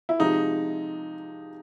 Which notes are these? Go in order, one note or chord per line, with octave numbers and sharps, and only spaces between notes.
E4
C3 F3 G#3 D#4